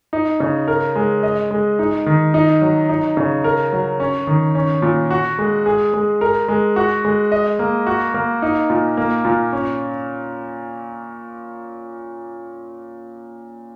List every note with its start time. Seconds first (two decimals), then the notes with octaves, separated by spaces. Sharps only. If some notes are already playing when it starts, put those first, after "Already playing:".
0.13 D#4
0.40 C#3
0.68 A#4
0.96 G#3
1.23 D#5
1.51 G#3
1.79 D#4
2.06 D#3
2.34 D#4
2.61 F#3
2.89 D#4
3.17 C#3
3.44 A#4
3.73 F#3
4.00 C#4
4.27 D#3
4.55 C#4
4.82 A#2
5.11 F#4
5.39 G#3
5.66 G#4
5.94 G#3
6.21 A#4
6.48 G#3
6.76 F#4
7.05 G#3
7.32 D#5
7.59 A#3
7.87 F#4
8.14 A#3
8.42 D#4
8.70 A#2
8.97 A#3
9.25 A#2
9.53 C#4